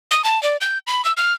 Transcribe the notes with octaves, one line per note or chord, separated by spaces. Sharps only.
D#6
A5
D5
G6
B5
E6
F6